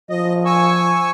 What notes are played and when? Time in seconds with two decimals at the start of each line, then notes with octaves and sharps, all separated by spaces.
0.10 F3 D#5
0.45 G#5 C#6 E6